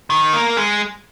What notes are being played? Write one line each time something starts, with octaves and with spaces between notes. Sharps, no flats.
D#3
A#3
G#3